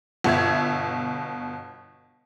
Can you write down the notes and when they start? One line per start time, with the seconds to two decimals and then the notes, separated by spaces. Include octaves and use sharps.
0.24 G1 B2 E5 G#6